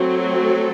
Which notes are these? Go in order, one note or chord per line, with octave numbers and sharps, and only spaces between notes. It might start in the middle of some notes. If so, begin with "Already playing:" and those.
Already playing: F#3 A3 C4
A4